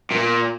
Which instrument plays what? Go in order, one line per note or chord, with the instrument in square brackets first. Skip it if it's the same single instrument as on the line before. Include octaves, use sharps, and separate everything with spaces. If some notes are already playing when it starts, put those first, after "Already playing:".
[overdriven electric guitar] A#2